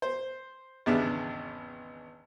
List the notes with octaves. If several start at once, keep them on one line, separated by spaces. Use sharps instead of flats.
C5
G#1 E2 C#3 B3 D4 E5